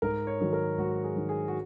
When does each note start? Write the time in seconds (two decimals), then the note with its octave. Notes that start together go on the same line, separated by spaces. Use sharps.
0.02 G#2 A#4
0.27 C#5
0.40 D#3 F#3
0.53 A#4
0.78 G#2 F#4
1.04 G#4
1.16 D#3 F#3
1.29 G#4
1.48 F#4